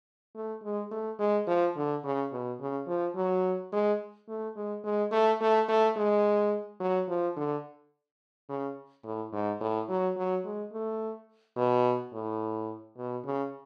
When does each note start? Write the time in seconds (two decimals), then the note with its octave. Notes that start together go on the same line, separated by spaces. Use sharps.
0.35 A3
0.63 G#3
0.91 A3
1.19 G#3
1.47 F3
1.76 D3
2.04 C#3
2.32 B2
2.60 C#3
2.87 F3
3.15 F#3
3.72 G#3
4.28 A3
4.56 G#3
4.84 G#3
5.12 A3
5.41 A3
5.68 A3
5.97 G#3
6.80 F#3
7.09 F3
7.36 D3
8.49 C#3
9.04 A2
9.32 G#2
9.60 A2
9.89 F#3
10.17 F#3
10.45 G#3
10.73 A3
11.56 B2
12.13 A2
12.98 B2
13.24 C#3